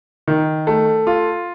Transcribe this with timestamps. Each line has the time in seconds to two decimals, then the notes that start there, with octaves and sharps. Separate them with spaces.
0.28 D#3
0.67 A3
1.07 F4